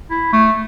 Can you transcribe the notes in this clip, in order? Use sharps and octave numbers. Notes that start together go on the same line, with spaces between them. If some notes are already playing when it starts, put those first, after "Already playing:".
E4
A3